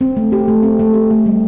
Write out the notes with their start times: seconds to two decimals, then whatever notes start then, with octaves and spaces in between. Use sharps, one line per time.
0.01 C4
0.17 A3
0.32 G4
0.48 A3
0.63 C4
0.79 A3
0.94 G4
1.11 A3
1.26 G3